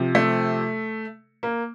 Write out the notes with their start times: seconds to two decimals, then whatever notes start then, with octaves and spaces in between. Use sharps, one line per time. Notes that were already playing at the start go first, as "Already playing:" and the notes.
Already playing: C3 F3
0.15 A3
1.43 A#3